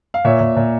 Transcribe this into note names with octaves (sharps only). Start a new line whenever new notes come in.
F5
A#2 C#5 E5
A#2
A#2